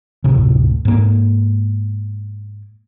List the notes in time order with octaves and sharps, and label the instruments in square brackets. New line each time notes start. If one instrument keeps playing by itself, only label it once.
[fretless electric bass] D1 G1 A2 C3
G#2 A#3